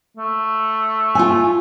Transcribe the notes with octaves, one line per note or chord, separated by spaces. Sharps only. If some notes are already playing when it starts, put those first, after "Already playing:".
A3
F4 G#5